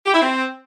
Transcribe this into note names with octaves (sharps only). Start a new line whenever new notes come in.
G4
E4
C4